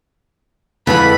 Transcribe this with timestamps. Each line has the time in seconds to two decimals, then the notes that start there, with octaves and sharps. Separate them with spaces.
0.87 F2 D3 E3 G#3 B5